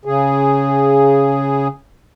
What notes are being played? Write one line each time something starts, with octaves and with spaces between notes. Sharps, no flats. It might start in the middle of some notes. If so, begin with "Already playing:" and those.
C#3 G#4